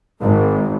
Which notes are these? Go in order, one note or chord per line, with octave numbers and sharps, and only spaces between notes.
G#1